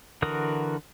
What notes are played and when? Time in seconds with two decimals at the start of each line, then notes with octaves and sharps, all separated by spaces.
0.22 D3 E3 F#4 A#4 D#6